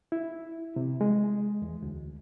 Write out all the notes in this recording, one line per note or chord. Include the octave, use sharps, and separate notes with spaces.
E4
C3
G#3
E2
D2